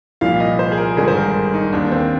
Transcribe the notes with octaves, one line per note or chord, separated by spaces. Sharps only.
C2 A#2 F3 F5
D#5
C5
G#4
A#4
G#1 G2 D3 G#4
C5
A#4
D#4
D#2 D#3 D4
C4